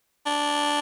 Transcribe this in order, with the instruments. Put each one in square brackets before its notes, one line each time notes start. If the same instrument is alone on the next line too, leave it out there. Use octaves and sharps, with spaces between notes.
[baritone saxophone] D4